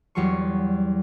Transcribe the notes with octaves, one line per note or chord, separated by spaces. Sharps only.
E2 F#3 G3 C6 C#6